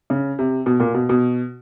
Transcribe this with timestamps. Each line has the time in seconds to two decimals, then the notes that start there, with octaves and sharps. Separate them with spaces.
0.10 C#3
0.39 C3
0.66 B2
0.80 A#2
0.94 B2
1.09 B2